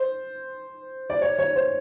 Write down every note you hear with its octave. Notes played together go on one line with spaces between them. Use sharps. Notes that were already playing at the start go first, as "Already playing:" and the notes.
Already playing: C5
D5
C#5
C#5
C5